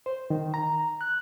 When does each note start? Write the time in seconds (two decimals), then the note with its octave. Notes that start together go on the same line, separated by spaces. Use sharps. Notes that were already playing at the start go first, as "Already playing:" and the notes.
0.06 C5
0.30 D#3
0.54 A#5
1.01 F#6